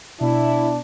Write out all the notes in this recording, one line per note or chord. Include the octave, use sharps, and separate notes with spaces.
B2 D4 E4